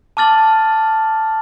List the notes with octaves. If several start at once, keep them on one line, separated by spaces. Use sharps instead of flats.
A5 D6 F6 A6 F#7